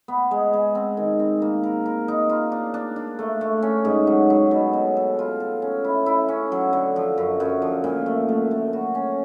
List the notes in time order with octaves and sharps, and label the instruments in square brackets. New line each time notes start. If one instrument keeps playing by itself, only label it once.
[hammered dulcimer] B3
G#3
G#3
C4
D#3
C4
A#3
A#4
A#4
D#4
F4
D4
D4
D4
A3
A3
C#4
G#2
F#3
F#3
B2
B2
A4
F4
A4
C#4
E4
E4
C#4
F#3
D3
F3
F#2
F#2
F3
A#2
A3
A3
A3
F#4
C#4